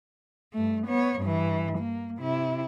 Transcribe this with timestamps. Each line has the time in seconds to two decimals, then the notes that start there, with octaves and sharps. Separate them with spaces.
0.53 G2 A3
0.87 B3 C#5
1.21 G2 E3
1.78 A#3
2.19 C3 E4